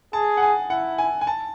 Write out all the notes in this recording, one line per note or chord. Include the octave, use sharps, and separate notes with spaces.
G#4 A5
F#5
G#5
E4 F#5
G#5
G#5
A5